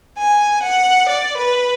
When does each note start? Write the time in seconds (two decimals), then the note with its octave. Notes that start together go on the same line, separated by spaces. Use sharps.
0.18 G#5
0.63 F#5
1.08 D5
1.37 B4